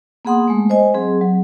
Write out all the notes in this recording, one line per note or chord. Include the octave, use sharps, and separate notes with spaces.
A#3 B3 G#4 F#5 C6 D#6
G#3 A3
C5 D#5 G#5
F#3 C4 G#4
F#3